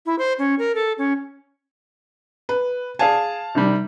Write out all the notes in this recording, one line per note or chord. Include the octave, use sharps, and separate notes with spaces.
E4
C5
C#4
A#4
A4
C#4
B4
G#4 D5 F5 G#5 A5
C3 D#3 G3